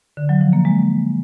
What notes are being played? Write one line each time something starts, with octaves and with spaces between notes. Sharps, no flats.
D3
F#3
F3
A#3
G#3